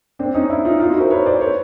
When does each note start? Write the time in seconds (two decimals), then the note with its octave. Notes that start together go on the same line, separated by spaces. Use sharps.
0.19 C4 D4
0.34 C#4 D#4
0.49 D4 E4
0.65 D#4 F4
0.80 D#4 F4
0.90 E4 F#4
1.00 A#4 C5
1.10 B4 C#5
1.26 C5 D5
1.41 B4 C#5